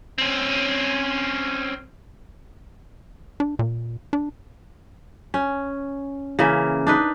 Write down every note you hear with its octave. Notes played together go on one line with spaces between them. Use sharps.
C4 C#4
D4
A#2
D4
C#4
C#3 E3 A#3
D4 D#4 B4